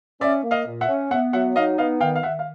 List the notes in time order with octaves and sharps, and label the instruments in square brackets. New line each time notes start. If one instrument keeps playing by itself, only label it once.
[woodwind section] C#4 [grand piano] D5 E5
[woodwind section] A#3
[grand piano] D#5 F5
[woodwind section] A#2
[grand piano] E5 F#5
[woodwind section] C#4
[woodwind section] B3 [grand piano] E5 F#5
[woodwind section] F#3 [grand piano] E5 F#5
[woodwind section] D#4 [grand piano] D#5 F5
[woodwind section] B3 [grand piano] D#5 F5
[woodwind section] D#3 [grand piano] F5 G5
[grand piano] F5
[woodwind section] D#3 [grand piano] E5 F#5
[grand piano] F5